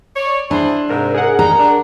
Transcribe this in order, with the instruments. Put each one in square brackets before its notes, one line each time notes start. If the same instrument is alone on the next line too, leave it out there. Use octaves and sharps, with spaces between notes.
[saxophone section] C#5 D5
[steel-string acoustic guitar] D4 [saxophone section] E4 G#4 C5
[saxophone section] G#2 C3 [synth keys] A#4
[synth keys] G#4 A#4 F#5
[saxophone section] G3 D#4 [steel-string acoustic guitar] A#5
[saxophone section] D4